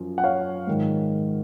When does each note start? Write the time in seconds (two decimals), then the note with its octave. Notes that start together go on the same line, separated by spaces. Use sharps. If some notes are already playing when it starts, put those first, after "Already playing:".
Already playing: F#2 F3
0.18 F#5
0.24 C#5 F5
0.67 G#2 D#3